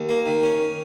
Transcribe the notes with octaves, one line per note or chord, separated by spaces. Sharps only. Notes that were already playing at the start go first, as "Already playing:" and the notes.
Already playing: D#2
A#3
D#3
C#4